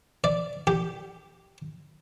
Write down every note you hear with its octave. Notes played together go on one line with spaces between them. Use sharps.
D5
G4